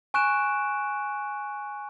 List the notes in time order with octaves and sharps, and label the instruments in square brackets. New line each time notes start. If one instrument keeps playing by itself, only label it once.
[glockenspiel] G#5 C#6 F#6 D7 E7